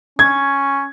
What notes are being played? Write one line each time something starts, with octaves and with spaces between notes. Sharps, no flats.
C#4 G#6